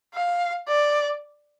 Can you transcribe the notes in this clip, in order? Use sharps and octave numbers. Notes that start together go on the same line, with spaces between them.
F5
D5